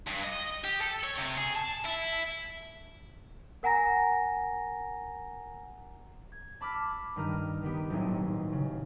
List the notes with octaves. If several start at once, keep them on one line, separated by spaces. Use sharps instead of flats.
G2
D#5
G4
A4
C#5
C3
G#4
A5
E4
A#4 F#5 G#5 A#5 A#6
G#6
A5 B5 D6 E6 F6 B6
G2 D#3 G3 D#4 A#5 F6
D#3 B3 G4
D#1 B1 A2 C4 D#4
C#3